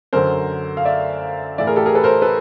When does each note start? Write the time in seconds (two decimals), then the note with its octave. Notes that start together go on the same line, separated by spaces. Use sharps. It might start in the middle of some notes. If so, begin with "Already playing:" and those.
0.13 F#2 D3 A#4 C5
0.77 F5
0.85 D5 E5
1.58 A2 E3 D5 E5
1.67 G#4 A#4
1.76 G4 A4
1.86 G#4 A#4
1.95 A4 B4
2.04 A#4 C5
2.22 A4 B4